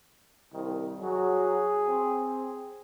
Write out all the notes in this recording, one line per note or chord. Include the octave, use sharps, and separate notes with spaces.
C2 D#3
F#3 F#4 G#4
C4